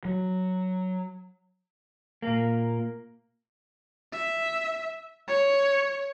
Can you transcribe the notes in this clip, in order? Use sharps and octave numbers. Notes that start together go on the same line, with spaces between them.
F#3
A#2 A#3
E5
C#5